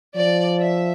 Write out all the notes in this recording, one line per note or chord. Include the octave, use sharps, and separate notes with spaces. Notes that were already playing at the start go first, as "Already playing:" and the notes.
F3 D5
E5